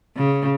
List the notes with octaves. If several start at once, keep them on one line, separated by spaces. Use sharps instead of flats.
C#3